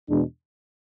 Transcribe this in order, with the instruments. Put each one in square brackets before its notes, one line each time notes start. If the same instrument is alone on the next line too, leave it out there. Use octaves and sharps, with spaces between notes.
[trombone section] E2 B2 G#3 D4